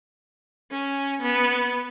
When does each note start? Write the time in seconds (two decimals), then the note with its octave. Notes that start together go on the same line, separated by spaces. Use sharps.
0.71 C#4
1.21 B3